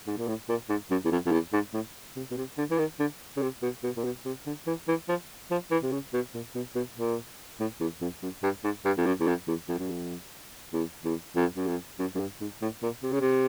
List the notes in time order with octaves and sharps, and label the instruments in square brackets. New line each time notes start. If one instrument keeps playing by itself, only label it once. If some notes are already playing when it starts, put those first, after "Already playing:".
[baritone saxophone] G#2
A#2
A2
A#2
G#2
F#2
E2
F2
F2
E2
G#2
A2
C3
B2
C3
D3
E3
D#3
D3
C#3
C3
B2
B2
A#2
B2
C3
D3
E3
E3
F3
F3
E3
C3
C#3
B2
A#2
B2
B2
A#2
A2
E2
F2
F#2
G2
G#2
G2
F2
F#2
E2
F2
E2
F2
F#2
F2
E2
E2
F2
F#2
F2
F#2
F#2
G2
G#2
A2
A#2
C3
C#3
C3